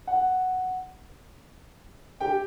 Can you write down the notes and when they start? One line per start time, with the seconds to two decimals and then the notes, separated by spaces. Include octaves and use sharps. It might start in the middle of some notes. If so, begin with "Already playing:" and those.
0.07 F#5
2.20 G4 G5